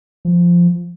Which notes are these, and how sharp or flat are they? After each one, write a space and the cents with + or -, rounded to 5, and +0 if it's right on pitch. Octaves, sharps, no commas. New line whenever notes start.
F3 -5